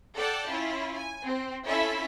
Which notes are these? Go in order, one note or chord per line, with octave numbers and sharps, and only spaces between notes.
A4 D5 F#5 G5 A5
C#4 E4 F4
G#5
C4
C#4 E4 F4 A4 E5